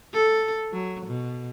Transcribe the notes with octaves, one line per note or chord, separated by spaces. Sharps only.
A4
F#3
B2